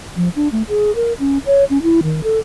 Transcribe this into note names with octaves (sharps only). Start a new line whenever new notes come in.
F3
D4
A3
G#4
A#4
C#4
C#5
C#4
E4
D#3
A4